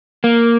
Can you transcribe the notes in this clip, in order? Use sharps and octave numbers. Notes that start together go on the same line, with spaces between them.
A#3